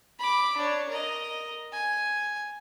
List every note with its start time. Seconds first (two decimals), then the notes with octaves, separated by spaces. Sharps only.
0.19 B5 D6
0.57 D4 C#5
0.89 A#4 D#5
1.73 G#5